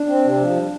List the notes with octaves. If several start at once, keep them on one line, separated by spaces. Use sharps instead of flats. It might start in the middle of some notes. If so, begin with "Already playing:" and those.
Already playing: D4
C4
C3
F3
G3